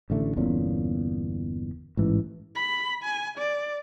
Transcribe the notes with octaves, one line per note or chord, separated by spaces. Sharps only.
A1 D3 A3
G1 E2 A#2 C#4
A1 G#2 E3
B5
G#5
D5